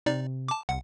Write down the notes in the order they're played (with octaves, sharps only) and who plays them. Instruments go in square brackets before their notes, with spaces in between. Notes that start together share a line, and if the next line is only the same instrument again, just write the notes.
[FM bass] C3 [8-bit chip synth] D#4 D5
[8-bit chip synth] A5 D6
[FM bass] C2 [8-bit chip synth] F#5